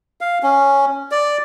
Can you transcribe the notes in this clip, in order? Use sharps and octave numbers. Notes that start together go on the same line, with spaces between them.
F5
C#4
D5